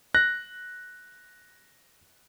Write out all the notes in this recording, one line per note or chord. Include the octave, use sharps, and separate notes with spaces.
F#6 A#6